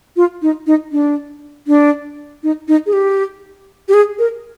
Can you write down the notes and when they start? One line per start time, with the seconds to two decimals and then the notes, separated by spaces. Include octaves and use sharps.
0.16 F4
0.42 D#4
0.67 D#4
0.92 D4
1.67 D4
2.43 D#4
2.68 D#4
2.86 G#4
2.93 G4
3.88 G4
3.94 G#4
4.19 A#4